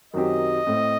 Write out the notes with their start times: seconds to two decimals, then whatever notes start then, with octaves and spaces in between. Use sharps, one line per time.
0.14 F#2 D#3 F#3 C4 G4 D#5
0.67 A2 A3 C4